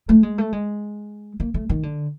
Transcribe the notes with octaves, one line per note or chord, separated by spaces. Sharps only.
A3
G#3
A3
G#3
A#3
A3
D#3
D3